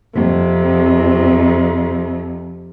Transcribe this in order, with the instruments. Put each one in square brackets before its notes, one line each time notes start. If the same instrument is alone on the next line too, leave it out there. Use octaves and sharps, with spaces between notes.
[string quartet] F2 C3